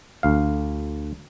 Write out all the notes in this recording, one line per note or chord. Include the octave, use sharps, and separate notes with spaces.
D2 F5